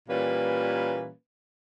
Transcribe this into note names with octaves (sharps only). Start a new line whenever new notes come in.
A#2 E3 G3 A#3 C#4 B4